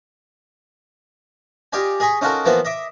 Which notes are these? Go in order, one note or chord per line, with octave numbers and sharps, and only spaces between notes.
F4 G4 D5 D#5 G#5
G#4 D#5 G#5 B5 C#6
C#4 D#4 F4 F#4 A4 A#4
E3 F3 A#3 B3 F4 F#4
D#5 E5 D6